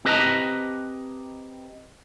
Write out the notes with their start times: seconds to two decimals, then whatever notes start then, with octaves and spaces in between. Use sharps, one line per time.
0.05 C4 G4 B4 D#5 A5 A#5